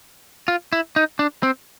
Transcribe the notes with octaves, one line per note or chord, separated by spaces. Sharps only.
F4
E4
D#4
D4
C4